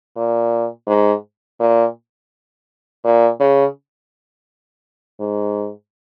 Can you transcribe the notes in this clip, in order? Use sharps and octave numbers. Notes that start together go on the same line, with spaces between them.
A#2
G#2
A#2
A#2
C#3
G#2